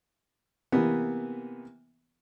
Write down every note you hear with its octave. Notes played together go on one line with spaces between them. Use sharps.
C3 E3 A#3 B3